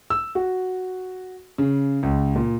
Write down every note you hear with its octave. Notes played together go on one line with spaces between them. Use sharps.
E6
F#4
C#3
C#2
A#2